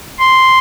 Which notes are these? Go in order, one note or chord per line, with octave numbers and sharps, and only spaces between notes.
C6